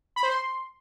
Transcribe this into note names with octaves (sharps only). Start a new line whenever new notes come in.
B5
C5
C6